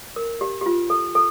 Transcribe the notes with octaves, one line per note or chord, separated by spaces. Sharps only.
A#4
G4
G4
F4
A4
A4